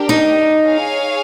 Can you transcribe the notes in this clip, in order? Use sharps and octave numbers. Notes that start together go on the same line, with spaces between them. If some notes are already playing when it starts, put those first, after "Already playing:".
Already playing: D4 G4 A#4
D#4
G#4 C#5 F5 G#5